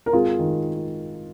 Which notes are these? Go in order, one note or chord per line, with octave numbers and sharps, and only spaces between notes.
A#4
G#1 F4 G#4
D#3